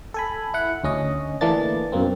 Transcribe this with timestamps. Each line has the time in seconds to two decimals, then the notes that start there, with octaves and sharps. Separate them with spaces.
0.14 A4 G#5 B5
0.54 E4 F#5
0.84 D2 C#4 D#5
1.41 E3 A3 A#3 D4 A6
1.92 F#2 B2 A#3 C4